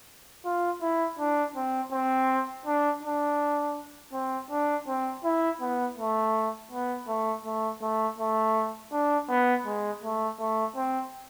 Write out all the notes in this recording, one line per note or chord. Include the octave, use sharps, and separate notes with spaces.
F4
E4
D4
C4
C4
D4
D4
C4
D4
C4
E4
B3
A3
B3
A3
A3
A3
A3
D4
B3
G#3
A3
A3
C4